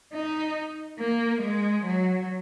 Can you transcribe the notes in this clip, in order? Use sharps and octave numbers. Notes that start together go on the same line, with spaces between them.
D#4
A#3
G#3
F#3